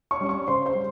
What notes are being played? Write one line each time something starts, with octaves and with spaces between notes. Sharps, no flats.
C#5 C#6
G3 C#4
C#5 C#6
C#3 C5 C6
C5 C6
G3